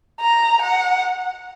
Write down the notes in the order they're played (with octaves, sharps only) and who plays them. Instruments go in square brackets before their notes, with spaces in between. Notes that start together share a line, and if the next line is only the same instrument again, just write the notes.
[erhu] A#5
F#5